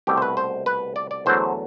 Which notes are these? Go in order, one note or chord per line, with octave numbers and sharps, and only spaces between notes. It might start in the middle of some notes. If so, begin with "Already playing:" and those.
C2 B2 A3 G4
C5
B4
C5
B4
D5
D5
E2 D3 F#3 A3 C5